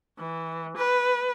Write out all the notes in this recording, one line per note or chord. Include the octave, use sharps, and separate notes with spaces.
E3
B4